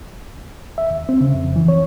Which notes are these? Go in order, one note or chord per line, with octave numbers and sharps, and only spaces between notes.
E5
D#2
C4
C#3
F2
E3
C#5